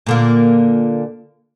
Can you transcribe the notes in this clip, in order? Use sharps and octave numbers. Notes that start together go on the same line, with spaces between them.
A#2 D3 A#3